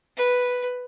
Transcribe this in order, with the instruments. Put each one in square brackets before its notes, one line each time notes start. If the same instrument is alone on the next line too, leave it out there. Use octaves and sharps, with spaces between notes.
[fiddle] B4